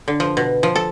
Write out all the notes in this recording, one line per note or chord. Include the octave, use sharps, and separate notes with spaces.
D3
F3
B2
F3
A4